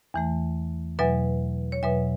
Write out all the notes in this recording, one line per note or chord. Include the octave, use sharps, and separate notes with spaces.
E2 E3 A3
E2 B2 F#3 B4 E5
C#5
E2 B2 F#3 B4 E5